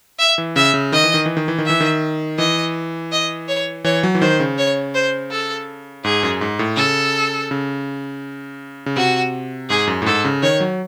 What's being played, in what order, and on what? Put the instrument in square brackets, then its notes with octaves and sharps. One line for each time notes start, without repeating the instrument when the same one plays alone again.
[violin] E5
[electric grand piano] E3
[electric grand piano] C#3 [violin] E5
[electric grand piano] C#3
[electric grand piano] D#3 [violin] D#5
[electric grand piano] E3
D#3
E3
D#3
E3
D#3
[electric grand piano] E3 [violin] E5
[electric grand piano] D#3
[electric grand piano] E3 [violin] D#5
[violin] D#5
C#5
[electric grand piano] E3 [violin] C#5
[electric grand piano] F#3
E3
[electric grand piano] D#3 [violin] C5
[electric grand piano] C#3
[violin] C#5
C5
A4
[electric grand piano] G#2 [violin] G#4
[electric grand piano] F#2
G#2
A2
[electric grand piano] C#3 [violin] A4
[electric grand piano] C#3
C#3
[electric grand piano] C3 [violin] F#4
[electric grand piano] G#2 [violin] G#4
[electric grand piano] F#2
A2
[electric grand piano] G#2 [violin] A4
[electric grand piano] C#3
[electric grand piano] D#3 [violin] C#5
[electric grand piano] F#3